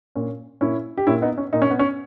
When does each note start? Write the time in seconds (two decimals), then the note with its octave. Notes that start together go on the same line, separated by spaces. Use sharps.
0.15 A#2 C#4
0.61 A#2 C#4 E4
0.97 G4
1.07 A#2 C#4 E4
1.22 B3 D#4
1.38 C#4
1.53 A#2 D#4
1.62 C#4
1.70 B3
1.79 C#4